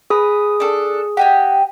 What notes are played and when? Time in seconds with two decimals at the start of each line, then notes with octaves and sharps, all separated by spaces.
0.10 G#4 B4 D#6
0.60 D4 A4
1.17 G4 D#5 F#5 G#5